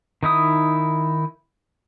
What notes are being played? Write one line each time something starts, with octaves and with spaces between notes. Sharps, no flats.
D#3 D#4 E4 D#6